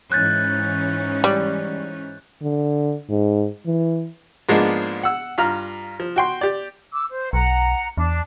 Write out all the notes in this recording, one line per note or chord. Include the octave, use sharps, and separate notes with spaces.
G#2 E3 C#4 F#6 G6 A6
G3
D3
G#2
E3
G#2 F3 G#3 A#3 B3 D4
F#5 E6
G2 F4 A#5 F6
F3
F#4 G5 C6
G4 D5
D6 E6
C5
B1 F#5 A#5
E2 D4 A5